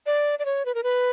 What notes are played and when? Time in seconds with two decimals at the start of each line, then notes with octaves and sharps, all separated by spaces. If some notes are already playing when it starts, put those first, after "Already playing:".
0.06 D5
0.39 D5
0.45 C#5
0.65 B4
0.75 A#4
0.83 B4